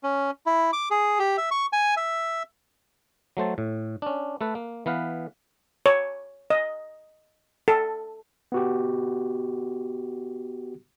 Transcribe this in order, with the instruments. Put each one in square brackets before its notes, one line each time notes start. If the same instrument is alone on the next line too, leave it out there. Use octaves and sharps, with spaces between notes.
[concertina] C#4
E4
D6
G#4
G4
E5
C#6
G#5
E5
[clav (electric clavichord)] F#3 A3 C5 A5
A2
C#4 D4
A3 A4 B4
A#3
E3 B3 B4 F5
[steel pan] C#5
D#5
A4
[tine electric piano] B3 F#4 G4